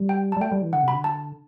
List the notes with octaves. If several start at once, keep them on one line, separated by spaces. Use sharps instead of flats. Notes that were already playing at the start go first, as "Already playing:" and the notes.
Already playing: G3
G5
A5
G3
A3 G5
G3
E3
D3 F#5
C3
B5
D3
A5